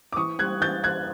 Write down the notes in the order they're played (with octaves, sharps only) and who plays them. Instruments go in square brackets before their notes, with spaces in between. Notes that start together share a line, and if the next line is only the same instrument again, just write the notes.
[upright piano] D6
E3 C#6 D#6
G3 F#6 G#6
E3 G6 A6
E3 F#6 G#6